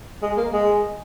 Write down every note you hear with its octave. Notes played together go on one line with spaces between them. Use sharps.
G#3
A#3
G#3